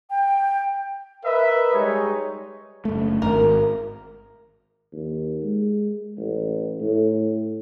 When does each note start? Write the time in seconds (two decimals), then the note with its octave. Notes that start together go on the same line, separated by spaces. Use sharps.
0.10 G5
1.25 A#4 B4 D#5 E5
1.73 G3 G#3 D#4 C#5
2.85 F#1 A3
3.22 G#1 A#4
4.93 D#2
5.43 G#3
6.17 A1
6.81 A2